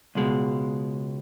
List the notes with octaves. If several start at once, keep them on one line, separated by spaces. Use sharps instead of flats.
C#2 B2 G#3